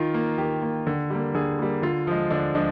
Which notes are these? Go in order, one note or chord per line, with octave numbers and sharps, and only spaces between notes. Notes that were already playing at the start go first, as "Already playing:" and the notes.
Already playing: D#3 F4
A#3
D#3 G4
A#3
D3
G3 A#3
D3 G#4
G3 A#3
D3 F4
F3 G#3
D3 D4
F3 G#3 D4